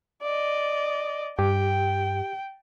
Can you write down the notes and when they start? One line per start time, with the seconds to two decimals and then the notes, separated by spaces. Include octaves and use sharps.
0.23 D5 D#5
1.39 G2 G4 G5